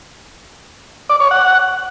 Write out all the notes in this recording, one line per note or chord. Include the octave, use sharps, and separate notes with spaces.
D5
C#5
F#5